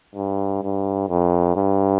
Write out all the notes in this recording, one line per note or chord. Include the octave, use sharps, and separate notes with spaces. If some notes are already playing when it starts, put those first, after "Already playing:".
G2
G2
F2
G2